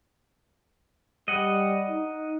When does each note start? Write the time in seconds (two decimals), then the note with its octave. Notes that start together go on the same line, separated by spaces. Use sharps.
1.28 G3 D#5 F#5
1.88 D#4